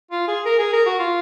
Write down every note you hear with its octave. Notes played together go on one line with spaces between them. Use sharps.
F4
G#4
A#4
G#4
A#4
F#4
F4